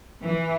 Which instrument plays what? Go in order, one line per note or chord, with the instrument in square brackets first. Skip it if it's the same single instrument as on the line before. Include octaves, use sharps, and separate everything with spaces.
[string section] E3